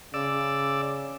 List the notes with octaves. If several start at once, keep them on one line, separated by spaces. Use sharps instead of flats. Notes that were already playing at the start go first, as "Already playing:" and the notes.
C#3 D5 E6